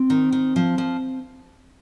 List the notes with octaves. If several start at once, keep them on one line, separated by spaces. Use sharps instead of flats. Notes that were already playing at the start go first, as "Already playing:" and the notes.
Already playing: C4
D#3
D#3
F3
F3